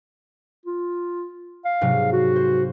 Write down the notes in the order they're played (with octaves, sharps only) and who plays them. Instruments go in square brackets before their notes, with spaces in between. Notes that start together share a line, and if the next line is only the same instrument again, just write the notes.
[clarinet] F4
F5
[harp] G#2 C3 F#3
[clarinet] F#4
[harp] C5